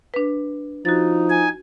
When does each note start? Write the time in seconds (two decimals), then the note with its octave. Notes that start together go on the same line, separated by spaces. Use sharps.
0.14 D4 B4
0.85 F3 D#4 F#4 A6
1.30 G#5